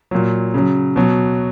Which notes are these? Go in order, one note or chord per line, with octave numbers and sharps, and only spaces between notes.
A#2 F#3
C#3 F#3
B2 F#3